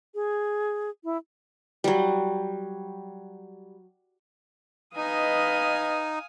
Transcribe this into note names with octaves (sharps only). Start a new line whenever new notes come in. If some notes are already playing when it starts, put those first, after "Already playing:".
G#4
E4
F#3 G3
D#4 B4 D#5 F5 G#5 D#6